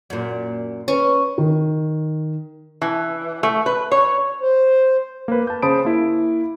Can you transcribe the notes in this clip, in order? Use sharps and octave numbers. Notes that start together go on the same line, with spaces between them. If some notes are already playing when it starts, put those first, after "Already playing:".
F#2 A#2
C#4 B4 C#6
D#3
E3
A3
B4
C#5
C5
A#3 B4
A5 G6
C#3 C5 A5 B5 D#6 D7
A#3 E4